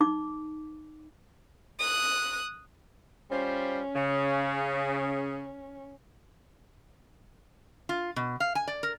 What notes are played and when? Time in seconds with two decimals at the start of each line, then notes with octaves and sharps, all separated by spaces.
0.01 D#4 D6
1.80 D#6 F#6
3.30 G3 C#4 F4 C5
3.94 C#3
7.89 F4
8.16 B2
8.40 F5
8.55 G#5
8.67 D5
8.83 A#4